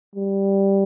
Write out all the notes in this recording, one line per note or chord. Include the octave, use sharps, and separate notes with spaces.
G3